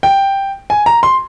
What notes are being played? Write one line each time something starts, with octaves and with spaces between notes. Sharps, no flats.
G5
G#5
A#5
C6